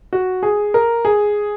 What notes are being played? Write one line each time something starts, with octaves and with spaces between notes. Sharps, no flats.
F#4
G#4
A#4
G#4